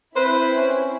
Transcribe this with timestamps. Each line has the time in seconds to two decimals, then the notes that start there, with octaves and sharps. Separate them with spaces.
0.16 C4 E4 B4 C5
0.56 C#4